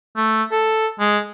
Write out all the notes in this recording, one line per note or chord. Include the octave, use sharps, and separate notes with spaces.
A3
A4
G#3